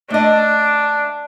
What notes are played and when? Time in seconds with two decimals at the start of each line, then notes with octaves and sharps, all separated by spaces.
0.10 A3 D4 D#5